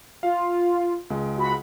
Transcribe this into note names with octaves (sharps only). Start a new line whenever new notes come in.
F4 F5
C#2 G#3
F#4 B5